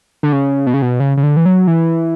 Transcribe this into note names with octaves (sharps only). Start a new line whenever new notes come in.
D3
C#3
B2
C#3
B2
C#3
C#3
D3
E3
F#3
E3